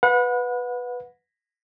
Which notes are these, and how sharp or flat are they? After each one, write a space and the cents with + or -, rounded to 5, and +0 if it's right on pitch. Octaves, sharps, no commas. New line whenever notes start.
B4 +0 F#5 -35